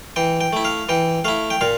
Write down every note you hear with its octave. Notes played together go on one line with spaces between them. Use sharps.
E3 G5
G5
A3 E4
F5
E3 G5
A3 E4 F5
G5
A#2 F5